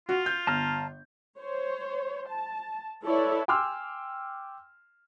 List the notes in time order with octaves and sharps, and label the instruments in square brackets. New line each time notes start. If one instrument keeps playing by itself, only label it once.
[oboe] F4 [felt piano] F#4
[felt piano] G6
[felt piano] G1 [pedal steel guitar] A5 A#5 F6
[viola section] C5 C#5
A5
E4 A4 B4 C#5 D5 E5
[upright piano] G5 G#5 C6 D6 E6 F6